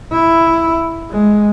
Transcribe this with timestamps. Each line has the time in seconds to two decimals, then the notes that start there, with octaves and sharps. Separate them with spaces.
0.12 E4
1.10 G#3